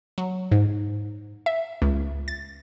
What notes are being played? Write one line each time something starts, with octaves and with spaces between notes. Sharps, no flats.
F#3
G#2
E5
C#2
A6